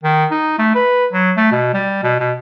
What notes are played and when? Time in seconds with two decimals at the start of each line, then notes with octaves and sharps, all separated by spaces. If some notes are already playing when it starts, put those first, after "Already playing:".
0.03 D#3
0.31 D#4
0.59 A3
0.75 B4
1.13 F#3
1.37 A3
1.52 B2
1.73 G3
2.03 B2
2.20 B2